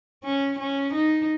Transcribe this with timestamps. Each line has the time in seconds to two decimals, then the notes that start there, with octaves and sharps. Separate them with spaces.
0.24 C#4
0.59 C#4
0.94 D#4